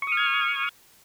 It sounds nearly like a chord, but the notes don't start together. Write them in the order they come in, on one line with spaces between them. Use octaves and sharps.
C#6 D#6 F6 G#6